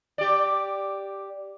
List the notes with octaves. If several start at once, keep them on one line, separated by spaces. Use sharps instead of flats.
G4 D5